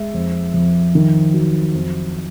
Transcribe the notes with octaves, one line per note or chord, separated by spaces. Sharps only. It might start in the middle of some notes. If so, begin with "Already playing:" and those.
Already playing: G#3 E5
F2
F2
D#3
F#3
F2